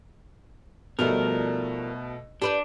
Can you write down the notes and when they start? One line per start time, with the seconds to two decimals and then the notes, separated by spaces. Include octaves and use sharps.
0.99 B2 F3 G3 A3 D#4 A#4
2.42 D4 G4 B4 D5